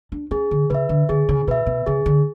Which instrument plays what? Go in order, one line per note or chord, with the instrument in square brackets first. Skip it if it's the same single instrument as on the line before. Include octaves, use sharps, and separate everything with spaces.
[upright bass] D4
[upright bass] C#4 [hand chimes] G#4
[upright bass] D3
[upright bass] C#3 [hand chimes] B4 E5
[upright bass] D3
[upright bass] D3 [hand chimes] G#4
[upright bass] C#3
[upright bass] B2 [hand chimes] B4 E5
[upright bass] B2
[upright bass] C#3 [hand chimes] G#4
[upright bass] D3